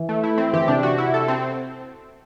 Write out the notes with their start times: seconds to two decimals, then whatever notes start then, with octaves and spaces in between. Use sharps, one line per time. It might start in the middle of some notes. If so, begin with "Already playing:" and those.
Already playing: E3
0.09 A3
0.23 E4
0.38 C4
0.53 E3 G4
0.68 C3 D4
0.83 F#4
0.98 E4
1.14 A4
1.28 C4